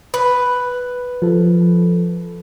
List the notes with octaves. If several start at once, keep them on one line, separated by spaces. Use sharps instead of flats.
B4
F3 A4